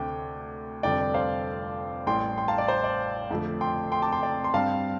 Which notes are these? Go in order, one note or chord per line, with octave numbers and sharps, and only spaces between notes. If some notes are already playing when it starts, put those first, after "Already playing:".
Already playing: D2 C3 A3 C4 G5 D6
F1 F2 D3 G3 C4 D5 G5
C5 F5
A1 A2 G3 G5 C6
G5 C6
F5 A5
D5
C5
D5
F2 D3 F3 A3
G5 C6
G5 C6
A5 D6
G5 C6
D5 G5
C6
G2 G3 C4 F5 A5